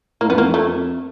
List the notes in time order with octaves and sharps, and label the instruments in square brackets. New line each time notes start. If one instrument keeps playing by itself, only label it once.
[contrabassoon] A2 [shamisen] A#3
[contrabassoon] F2 [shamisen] B3
[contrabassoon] E2 [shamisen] A#3
[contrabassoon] F2
[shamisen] A3